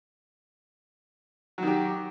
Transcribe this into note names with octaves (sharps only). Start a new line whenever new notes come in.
D#3 F#3 G4